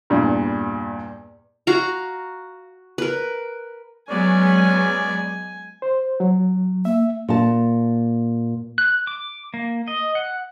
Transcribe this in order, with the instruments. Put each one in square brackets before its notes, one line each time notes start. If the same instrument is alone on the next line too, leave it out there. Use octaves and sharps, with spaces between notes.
[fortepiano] E2 G2 A#2
[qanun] F#4 F5 A#5
A#4 B4
[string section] F#3 G#3 B3 [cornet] C#4 [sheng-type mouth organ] D5 [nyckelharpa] G#5
[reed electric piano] C5
F#3
[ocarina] A#3 [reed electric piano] E5
[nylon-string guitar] A#2 A5
[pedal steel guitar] F#6
D6
A#3
D#5
F#5